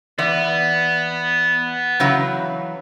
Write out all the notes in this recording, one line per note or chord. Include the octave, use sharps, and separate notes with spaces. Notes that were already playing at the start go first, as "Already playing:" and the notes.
E3 B3 D5
C#3 E3 F#3